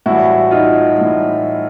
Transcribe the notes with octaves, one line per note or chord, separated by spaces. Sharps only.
A2 E3 G3 E4 F#4
D#4 F4
A2 E3 G3